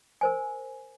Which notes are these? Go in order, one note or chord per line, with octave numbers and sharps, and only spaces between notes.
A#4 C5 G#5